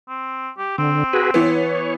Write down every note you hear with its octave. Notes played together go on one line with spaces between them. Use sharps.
C4
G4
D3 C4
F#4 G#4 B4
E3 B3 C#5